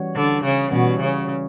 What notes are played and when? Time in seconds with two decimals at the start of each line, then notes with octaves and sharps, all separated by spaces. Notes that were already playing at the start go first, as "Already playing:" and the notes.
Already playing: E3 G3 C#4 F#4 C#5
0.16 D3
0.44 C#3
0.72 B2 E3 G3 C#4 F#4 C#5
1.00 C#3